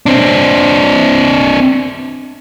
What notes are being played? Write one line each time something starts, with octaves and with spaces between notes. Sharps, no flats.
C4 D4